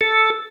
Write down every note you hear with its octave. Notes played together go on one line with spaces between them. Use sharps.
A4